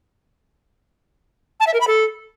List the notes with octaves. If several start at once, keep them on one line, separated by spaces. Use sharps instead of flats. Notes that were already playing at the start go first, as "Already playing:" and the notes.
A5
E5
A#4
B5
A4